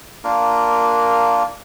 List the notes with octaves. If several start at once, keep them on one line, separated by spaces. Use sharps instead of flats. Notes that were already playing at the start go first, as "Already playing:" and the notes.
A#3 D4 F4 A#4